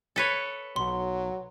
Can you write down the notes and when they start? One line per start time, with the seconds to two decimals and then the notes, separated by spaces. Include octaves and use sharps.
0.16 A4 B4 C#5
0.76 B1 F#3 C6